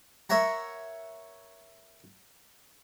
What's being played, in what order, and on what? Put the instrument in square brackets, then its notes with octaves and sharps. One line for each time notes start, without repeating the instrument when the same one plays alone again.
[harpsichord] A#4 C#5 E5 F#5 A#5